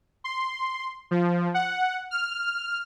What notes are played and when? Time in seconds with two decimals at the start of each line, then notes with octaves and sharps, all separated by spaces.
0.24 C6
1.11 F3
1.54 F#5
2.11 F6